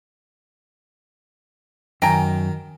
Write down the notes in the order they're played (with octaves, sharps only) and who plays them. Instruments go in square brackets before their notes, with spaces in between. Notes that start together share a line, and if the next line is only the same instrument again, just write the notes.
[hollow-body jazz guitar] F#2 G#5 [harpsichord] D#3 D#5 [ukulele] G5 A#5